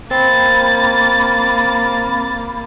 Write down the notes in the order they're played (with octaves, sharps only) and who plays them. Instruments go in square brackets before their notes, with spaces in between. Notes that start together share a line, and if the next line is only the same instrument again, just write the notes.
[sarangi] A#3 [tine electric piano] C4 [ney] B5 [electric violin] A6